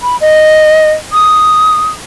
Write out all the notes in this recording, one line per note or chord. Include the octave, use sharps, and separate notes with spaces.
B5
D#5
D#6